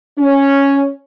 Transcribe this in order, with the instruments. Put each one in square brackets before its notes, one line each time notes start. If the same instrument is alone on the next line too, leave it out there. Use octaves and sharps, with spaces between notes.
[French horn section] C#4